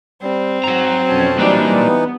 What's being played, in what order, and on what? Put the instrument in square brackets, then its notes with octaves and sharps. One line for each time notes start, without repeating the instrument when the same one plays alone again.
[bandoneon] G3 [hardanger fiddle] C4
[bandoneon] G#2 [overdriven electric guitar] F#3 A#5
[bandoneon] F2 B2 A5 [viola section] C#4
[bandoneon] E3 D#4 B4 [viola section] F#3 G3 D4 [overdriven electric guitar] A#3 D5
[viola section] B3